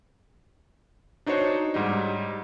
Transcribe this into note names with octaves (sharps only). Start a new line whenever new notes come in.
D4 D#4 F#4 C5 C#5
G#2 G3 D#4